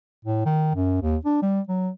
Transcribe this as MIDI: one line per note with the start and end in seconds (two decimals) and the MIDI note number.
0.25 0.41 45
0.46 0.70 51
0.74 1.01 42
1.02 1.16 39
1.25 1.40 62
1.42 1.61 55
1.69 1.90 54